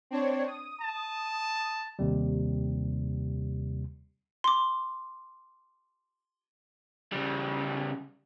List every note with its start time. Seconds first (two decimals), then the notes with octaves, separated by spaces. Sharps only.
0.11 C4 D4 C#5
0.47 D#6
0.82 A5
1.99 D#2 C3 G3
4.44 C6 D6
7.12 C#3 G3